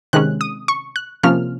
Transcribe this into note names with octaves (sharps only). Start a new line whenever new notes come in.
C3 D#3 G#3 C#4 F#6
D#6
C#6
F#6
C3 F3 A#3 C#4 F6